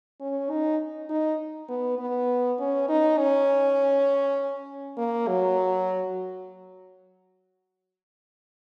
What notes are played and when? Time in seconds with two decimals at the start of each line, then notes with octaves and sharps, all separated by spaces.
0.21 C#4
0.50 D#4
1.10 D#4
1.69 B3
1.99 B3
2.59 C#4
2.89 D#4
3.18 C#4
4.98 A#3
5.28 F#3